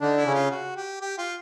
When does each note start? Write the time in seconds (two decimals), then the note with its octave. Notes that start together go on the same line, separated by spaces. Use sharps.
0.01 D3 D4 D#4
0.17 E4
0.26 C#3 C#4
0.34 F4
0.51 F#4
0.76 G4
1.01 G4
1.18 F4